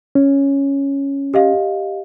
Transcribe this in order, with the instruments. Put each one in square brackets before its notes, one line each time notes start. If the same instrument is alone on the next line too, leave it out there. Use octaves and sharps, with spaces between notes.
[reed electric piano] C#4
[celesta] G4 D#5 F5